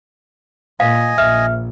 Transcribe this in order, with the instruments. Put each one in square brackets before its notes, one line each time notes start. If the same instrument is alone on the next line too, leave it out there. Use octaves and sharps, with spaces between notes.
[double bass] A#2 [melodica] D#5 G#5 [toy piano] F5
[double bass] A#1 [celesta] E5 F6